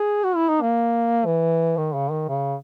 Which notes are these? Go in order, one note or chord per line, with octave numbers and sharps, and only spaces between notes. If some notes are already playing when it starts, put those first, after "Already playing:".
Already playing: G#4
F#4
E4
D#4
A#3
E3
D#3
C#3
D#3
C#3